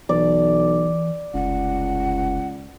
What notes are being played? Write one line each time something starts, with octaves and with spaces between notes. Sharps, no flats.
B1 E3 D5
F1 C#2 F#5